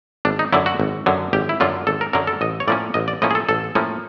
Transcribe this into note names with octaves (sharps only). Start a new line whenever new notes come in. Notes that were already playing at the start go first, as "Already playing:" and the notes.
G#1 D4
D#4
F#2 D3 F#3 E4
F#4
G#1
F#2 D3 F#3
G#1 G4
E4
F#2 D3 F#3 F4
G#1 A4
A#4
F#2 D3 F#3 A#4
A4
A1 D#5
C#5
A2 F3 A#3 C#4 D5
A1 D#5
D5
A2 F3 A#3 C#4 D#5
G#4
A4
A1 A4
A2 F3 A#3 C#4